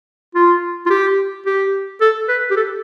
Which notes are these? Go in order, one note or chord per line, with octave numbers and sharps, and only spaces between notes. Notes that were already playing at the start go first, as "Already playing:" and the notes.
F4
F4
G4
G4
A4
B4
G4
A4